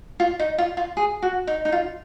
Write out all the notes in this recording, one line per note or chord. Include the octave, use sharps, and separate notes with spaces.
F4
D#4
F4
F4
G#4
F#4
D#4
D#4
F4